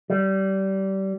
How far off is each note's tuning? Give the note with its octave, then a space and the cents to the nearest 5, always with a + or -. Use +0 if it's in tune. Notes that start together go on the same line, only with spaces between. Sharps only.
G3 -25